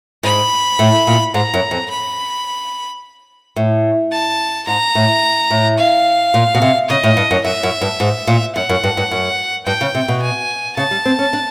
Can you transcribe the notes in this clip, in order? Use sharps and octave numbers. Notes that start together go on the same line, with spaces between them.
G#2 B5
A2
A#2
G#2 A#5
F#2
F2
B5
A2
A5
G#2 A#5
A2
A2
F5
A#2
B2
C3
C#3 D#5
A2
G2
F#2
F#2 E5
F#2
G2
G#2
A#2
F#2 F#5
F#2
G2
G2
F#2
G2 G5
C#3
C3
B2
G#5
C#3 A5
G3
C4
C#4
D4